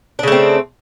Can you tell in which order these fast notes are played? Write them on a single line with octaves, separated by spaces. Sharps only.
D4 C#3 A3 C4